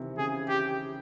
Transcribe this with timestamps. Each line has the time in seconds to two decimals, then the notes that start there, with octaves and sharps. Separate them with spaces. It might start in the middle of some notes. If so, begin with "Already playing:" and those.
Already playing: C3 D#3 E3
0.18 C#3 G#4
0.49 G4